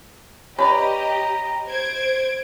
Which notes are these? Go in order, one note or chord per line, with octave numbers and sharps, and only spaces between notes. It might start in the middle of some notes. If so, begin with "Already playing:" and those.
C#4 G4 B4 D5 D#5 A#5 B5
C5 G#6 D7